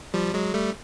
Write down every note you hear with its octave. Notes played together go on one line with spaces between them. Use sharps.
F3 G3
F#3 G#3
G3 A3